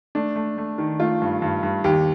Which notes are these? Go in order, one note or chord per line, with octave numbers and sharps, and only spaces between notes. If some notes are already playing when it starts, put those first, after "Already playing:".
A3 D4
A3
A3
D#3
A3 F4
G2
G2
G2
D#2 G4